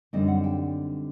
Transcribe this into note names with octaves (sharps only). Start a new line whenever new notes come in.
F#2 D3 G3 C4 D#4 D#5
F#5
G5